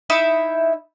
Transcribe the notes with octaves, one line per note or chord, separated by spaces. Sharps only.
D#4 E4 E5 B5